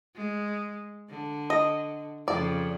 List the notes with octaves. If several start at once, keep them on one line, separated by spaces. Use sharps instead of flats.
G#3
D3
D#5
F2 C#3 D5